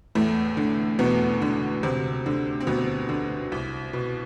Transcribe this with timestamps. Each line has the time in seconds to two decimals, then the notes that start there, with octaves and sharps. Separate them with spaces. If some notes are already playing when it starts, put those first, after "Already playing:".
0.15 E2 A2 A3
0.57 D3
0.99 E2 B2 B3
1.42 D3
1.83 D2 C3 C4
2.26 D3
2.60 C4
2.67 D2 B2 B3
3.09 D3
3.52 C2
3.93 B2